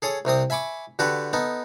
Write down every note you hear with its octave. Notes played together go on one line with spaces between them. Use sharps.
G#4 A4 C#5 D#6
C2 C3 C4 D#6
E5 G#5 B5 C#6 D6
D3 F#4 G4 A4 B4
B3 D#4 A4